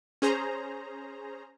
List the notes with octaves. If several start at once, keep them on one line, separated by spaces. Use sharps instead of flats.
C#4 G#4 C5 A#5